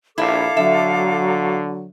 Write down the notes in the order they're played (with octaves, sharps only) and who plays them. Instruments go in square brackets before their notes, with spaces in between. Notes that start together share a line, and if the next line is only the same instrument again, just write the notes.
[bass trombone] A#1 [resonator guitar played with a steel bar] D4 E4 [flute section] A4 F5 D6
[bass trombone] D3 [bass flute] F#3 [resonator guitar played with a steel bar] E5